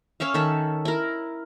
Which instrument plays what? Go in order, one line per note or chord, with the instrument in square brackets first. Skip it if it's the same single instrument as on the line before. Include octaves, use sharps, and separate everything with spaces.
[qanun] C#4 C#5 E5 F5
D#3 A4 E5
E4 A#4